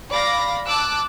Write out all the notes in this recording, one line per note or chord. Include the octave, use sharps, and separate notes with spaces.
D5 F5 B5 D6 A#6
A5 D6 E6 F#6